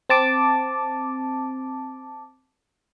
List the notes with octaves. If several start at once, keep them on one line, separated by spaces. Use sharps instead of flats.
C4 A5 D6